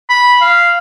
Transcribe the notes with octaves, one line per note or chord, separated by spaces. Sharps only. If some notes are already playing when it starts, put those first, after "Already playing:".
B5
F5